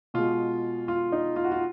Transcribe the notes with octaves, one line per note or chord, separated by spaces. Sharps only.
B2 G#3 F4
F4
D#4
F4
F#4
F4